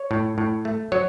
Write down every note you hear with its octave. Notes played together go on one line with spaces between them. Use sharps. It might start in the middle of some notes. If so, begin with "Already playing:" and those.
Already playing: C#5
A2
A2
A3
F#3 C#5